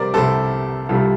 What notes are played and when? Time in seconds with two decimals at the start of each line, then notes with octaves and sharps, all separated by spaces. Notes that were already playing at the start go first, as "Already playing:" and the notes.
Already playing: C3 G3 A#4 C5 D5
0.14 C2 C3 G3 A4 C5
0.89 C2 C3 G3 F4 A4